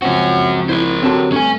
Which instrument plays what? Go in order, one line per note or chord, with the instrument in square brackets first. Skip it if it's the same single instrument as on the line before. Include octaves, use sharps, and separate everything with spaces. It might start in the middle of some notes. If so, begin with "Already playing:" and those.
[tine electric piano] C#2 F3 C4 [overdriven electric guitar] C#4 F#4
[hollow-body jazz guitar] E4 [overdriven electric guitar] A#4 C5
[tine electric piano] D3 F#3 G4 [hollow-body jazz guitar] C4 A5 C6
[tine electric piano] G2 A3 [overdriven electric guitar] C#4 G#5